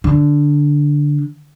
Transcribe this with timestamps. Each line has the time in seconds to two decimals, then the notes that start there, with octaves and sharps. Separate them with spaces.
0.04 D3